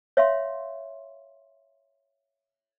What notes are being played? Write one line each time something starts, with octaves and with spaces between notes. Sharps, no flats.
C#5 E5 F5 C6